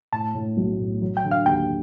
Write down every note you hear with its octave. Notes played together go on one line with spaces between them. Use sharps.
A2 A5
A2
B1
A2
F#3
G5
D3
F5
D#2 G5